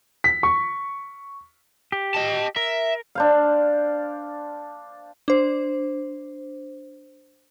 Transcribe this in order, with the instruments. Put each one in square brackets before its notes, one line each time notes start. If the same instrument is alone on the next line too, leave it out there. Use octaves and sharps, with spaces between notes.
[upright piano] B6
C#6
[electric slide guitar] G4
[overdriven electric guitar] D#5 A5
[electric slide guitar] A#4 [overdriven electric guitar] E5
[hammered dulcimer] D4 C5 F5
[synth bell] D4 C5